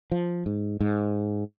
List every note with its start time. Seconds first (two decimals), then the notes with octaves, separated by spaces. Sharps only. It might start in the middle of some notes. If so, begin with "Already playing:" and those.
0.12 F3
0.46 G#2
0.80 G#2